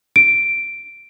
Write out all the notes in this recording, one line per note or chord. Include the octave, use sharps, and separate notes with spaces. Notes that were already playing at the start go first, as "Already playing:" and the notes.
D7